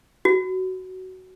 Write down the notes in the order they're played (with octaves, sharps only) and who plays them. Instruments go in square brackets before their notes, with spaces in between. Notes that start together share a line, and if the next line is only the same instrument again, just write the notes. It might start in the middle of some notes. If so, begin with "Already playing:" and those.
[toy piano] F#4